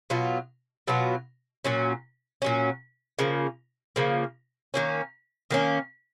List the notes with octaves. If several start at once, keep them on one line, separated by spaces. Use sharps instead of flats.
B2 F#3 B3 F4
B2 F#3 B3 F4
A#2 F#3 C#4
A#2 F#3 C#4
C#3 F3 A#3
C#3 F3 A#3
D#3 A#3 C#4
D#3 A#3 C#4